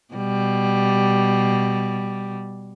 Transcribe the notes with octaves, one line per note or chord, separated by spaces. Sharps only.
B2 G3